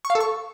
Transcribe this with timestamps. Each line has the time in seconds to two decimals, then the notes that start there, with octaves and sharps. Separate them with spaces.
0.05 C#6
0.10 F5
0.15 A4
0.20 C#6